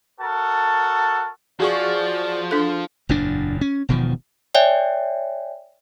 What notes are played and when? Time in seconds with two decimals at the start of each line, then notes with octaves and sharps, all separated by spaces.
0.20 F#4 A4 A#4 A5
1.60 F3 F#4 G#4 D5 C#6
2.51 D4 A4
3.09 F#1 E2 A#2 D4
3.61 C#4
3.89 E1 B2 D#3 F3
4.54 C#5 D5 E5 G5 G#5